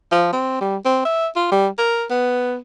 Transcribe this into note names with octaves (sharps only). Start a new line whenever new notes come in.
F3
C4
G3
C4
E5
F4
G3
A#4
B3